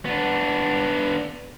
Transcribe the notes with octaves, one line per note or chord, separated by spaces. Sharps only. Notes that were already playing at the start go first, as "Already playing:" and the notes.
B3 D4